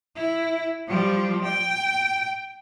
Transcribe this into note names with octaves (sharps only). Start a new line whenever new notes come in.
E4
F3 G3
G5